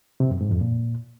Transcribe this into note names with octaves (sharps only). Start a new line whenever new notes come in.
C3
F#2
G#2
F2
A#2